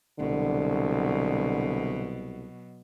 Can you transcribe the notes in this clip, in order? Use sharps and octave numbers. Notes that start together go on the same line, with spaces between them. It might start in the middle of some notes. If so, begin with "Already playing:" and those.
C2 B2 D3 F#3